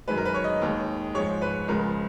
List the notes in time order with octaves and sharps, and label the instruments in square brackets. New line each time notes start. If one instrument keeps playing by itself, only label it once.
[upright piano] F#2 D#3 G#3 B4
A#4
B4
C#5
D#5
D#2 D#3 G#3
G#2 F3 G#3 C#5
B4
C#2 C#3 F3 G#3 A#4